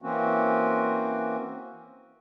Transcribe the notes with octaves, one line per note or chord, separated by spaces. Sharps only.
E3 A#3 C4 C#4 F#4